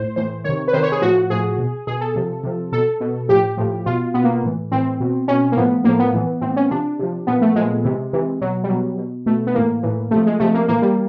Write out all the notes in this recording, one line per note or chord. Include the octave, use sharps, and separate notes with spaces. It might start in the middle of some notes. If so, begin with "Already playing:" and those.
Already playing: A2 C5
A2 E3 C5
C3 D#3 C#5
B4
C3 D#3 C5
C#5
G#4
A2 F3 F#4
A2 F3 G#4
B2
B2 G#4
A4
C3 F3
C3 F3
B2 A4
B2
A2 F3 G4
A2 F3
B2 F4
B2 B3
A#3
A2 E3
A2 E3 C4
B2
B2 C#4
A#3
A2 F3 B3
A2 F3 A#3
B3
A2 E3
A2 E3 C4
C#4
C3 F3 D4
C3 F3
A#2 F3 B3
A3
A#2 F3 G#3
C3 E3
C3 E3
B2 F#3
G3
B2 F#3
B2
B2 A3
B3
A2 E3 A#3
A2 E3
C3 F3 A3
G#3
C3 F3 A3
A#3
A2 E3 A#3
G3